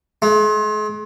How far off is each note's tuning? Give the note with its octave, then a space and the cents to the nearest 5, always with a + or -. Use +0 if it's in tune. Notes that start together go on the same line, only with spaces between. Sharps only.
G#3 +40